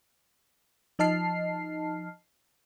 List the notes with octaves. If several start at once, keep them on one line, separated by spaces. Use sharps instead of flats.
F3 D#4 D#5 A5 F6 C7